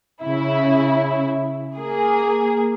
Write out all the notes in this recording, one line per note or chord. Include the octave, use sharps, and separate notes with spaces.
C#3 E4
A#3 G#4